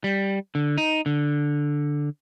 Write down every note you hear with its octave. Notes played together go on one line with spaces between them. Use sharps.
G3
D3
D#4
D3